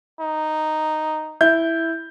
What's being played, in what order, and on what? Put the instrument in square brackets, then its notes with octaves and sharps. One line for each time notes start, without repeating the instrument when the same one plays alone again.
[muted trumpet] D#4
[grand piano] E4 G6